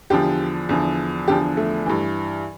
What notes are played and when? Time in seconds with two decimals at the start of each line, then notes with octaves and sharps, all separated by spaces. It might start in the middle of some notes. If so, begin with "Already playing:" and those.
0.10 E2 D3 F3 G4
0.69 E2 D3 F3
1.28 E2 D3 F3 G4
1.57 A3
1.86 G2 E3